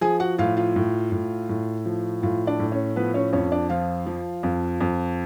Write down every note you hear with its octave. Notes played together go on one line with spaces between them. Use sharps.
F3 G#4 G#5
F#4 F#5
A2 F4 F5
F4 F5
A2
A2
A2
F3
A2 F4 F5
D4 D5
A2
C#4 C#5
F3 B3 B4
C#4 C#5
F2 C#4 C#5
D4 D5
F3 F4 F5
F3
F2
F2